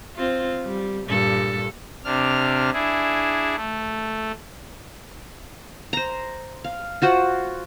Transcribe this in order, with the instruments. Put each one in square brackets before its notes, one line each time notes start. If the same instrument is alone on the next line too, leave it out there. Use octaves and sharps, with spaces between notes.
[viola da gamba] C4 F4
G3
G2 A#2 A4
[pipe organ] C3 D4 F6
D4 E4 G#4
A3
[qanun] C5 A#5
F5
F4 F#4 C5